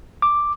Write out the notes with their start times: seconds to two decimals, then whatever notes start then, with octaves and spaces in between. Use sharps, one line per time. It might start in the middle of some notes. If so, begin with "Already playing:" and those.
0.22 D6